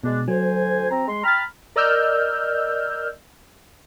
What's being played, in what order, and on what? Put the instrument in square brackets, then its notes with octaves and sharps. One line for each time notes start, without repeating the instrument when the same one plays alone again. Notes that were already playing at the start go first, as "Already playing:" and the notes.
[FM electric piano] B2 [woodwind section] G#3 D4
[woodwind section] D2 C5 G#5 [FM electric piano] F#3
[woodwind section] C4 A#5
G#3 C6
[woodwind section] G5 B5 F6 [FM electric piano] A#5 A6
[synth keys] A#4 D5 D#5 E6 F6 G6